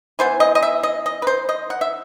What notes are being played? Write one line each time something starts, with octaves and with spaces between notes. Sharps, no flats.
E3 B3 C5
D#5
D#5
E5
D#5
D#5
B4
C5
D#5
F#5
E5